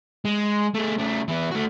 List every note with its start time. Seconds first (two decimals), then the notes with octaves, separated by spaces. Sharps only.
0.25 G#3
0.74 A3 G#4
0.98 C#3 A3
1.28 E3 B3
1.51 A3 F#4